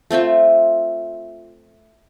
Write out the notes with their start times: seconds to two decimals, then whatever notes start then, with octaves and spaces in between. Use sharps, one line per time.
0.11 A3 C4 F4 E5